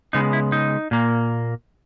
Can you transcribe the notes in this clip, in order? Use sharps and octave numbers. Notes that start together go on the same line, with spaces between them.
C#3 G#3 B3 D#4
E4
D#4
A#2 A#3